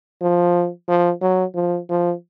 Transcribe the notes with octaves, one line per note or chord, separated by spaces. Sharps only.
F3
F3
F#3
F3
F3